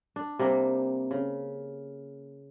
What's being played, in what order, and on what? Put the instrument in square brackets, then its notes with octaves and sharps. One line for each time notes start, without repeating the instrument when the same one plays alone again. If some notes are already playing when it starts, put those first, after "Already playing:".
[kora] D4
C3 G3 A#3 G5
C#3